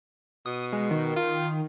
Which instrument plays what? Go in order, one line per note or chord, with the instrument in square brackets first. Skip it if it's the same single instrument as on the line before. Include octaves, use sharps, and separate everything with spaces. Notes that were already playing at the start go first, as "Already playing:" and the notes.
[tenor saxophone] B2 [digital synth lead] D#6
[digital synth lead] G#3
D#3
[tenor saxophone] F4